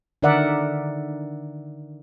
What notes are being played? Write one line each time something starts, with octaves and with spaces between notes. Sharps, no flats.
D3 D#3 A#4 D5 E5 F#5